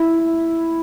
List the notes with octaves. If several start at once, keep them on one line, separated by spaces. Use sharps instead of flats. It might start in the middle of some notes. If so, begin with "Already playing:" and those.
Already playing: E4